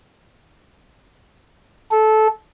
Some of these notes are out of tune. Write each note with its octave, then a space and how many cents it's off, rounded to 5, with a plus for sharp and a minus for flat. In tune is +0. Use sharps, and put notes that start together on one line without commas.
A4 -15